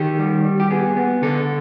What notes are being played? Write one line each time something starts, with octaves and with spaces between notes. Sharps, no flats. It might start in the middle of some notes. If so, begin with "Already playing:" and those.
Already playing: D#3 G4
G3
G3
G4
B3 G#4
B3
D3 A4